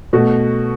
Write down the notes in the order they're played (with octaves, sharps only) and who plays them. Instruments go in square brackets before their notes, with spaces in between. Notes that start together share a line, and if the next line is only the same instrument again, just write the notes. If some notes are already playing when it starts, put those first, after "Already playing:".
[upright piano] B2 A3 F#4